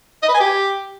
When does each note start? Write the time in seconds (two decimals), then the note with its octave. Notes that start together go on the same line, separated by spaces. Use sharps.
0.22 D#5
0.28 B4
0.34 G#5
0.40 G4